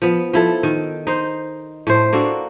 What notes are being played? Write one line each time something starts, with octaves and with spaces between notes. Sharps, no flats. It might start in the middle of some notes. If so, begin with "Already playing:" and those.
F3 B3
F3 E4 A4
D#3
D#4 C5
A2 A3 C5
A#3 D4 F#4 A4